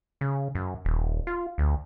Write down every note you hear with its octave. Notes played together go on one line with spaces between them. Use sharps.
C#3
F#2
D#1
F4
D2